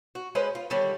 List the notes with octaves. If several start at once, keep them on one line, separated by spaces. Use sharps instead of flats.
F#4
G#3 C#4 B4 C5
F4
D3 D#3 G3 C#4